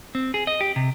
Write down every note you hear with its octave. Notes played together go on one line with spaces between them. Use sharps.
C4
G#4
D#5
G4
C3